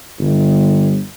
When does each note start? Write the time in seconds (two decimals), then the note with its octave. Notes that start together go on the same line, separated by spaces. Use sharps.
0.19 G1